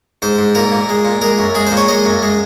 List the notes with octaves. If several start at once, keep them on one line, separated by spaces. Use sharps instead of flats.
G#2 C5
G#2
A#2 A#4
A#2
G#3
A#2
G#3 A#4
F#2
G#3 G#4
C5
A#2
C#5
G#3 D#5
F#2
G#3